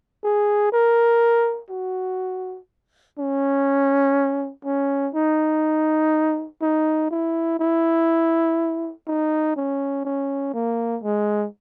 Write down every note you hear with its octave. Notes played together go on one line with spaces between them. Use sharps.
G#4
A#4
F#4
C#4
C#4
D#4
D#4
E4
E4
D#4
C#4
C#4
A#3
G#3